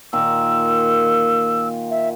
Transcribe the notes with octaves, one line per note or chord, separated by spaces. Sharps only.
A#2 D#3 E6
E5